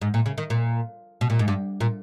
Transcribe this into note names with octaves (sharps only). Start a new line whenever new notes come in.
G#2
A#2
C#3
D#3
A#2
B2
A#2
G#2
G2
A#2